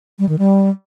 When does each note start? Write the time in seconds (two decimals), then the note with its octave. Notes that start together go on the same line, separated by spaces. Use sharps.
0.19 G3
0.29 D#3
0.39 G3